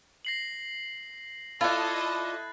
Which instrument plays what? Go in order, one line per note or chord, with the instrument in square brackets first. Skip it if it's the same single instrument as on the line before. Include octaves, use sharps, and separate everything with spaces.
[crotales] A#6 C7 F#7
[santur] E4 [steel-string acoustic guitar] F4 D5 [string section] A4 D#5 [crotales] F#6 A6